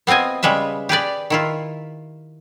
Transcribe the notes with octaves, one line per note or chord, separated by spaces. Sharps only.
B3 C4 F4 D#5 G#5
C#3 G3 G#3 B4 E5
G4 G#4 B4 D5
D#3 E4 F4